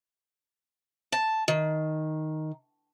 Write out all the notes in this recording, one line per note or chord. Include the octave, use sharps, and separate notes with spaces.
A5
D#3